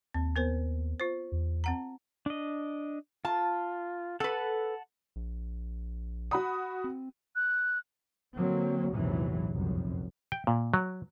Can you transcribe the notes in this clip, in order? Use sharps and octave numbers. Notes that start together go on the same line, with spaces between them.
D#2 C4
B3 A#4 C5
F4 C5
E2
C4 F#5 A#5
D4 D#5
F4 A5
A4 B4 F#5 A5
A#1
F#4 B5 D#6
C4
F#6
D3 F#3 A#3 C4
A#1 E2 G#2 C3 E3 F#3
F1 C2 F#2
G5
A#2
F#3